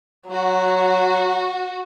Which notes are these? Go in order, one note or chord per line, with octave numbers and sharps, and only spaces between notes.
F#3 F#4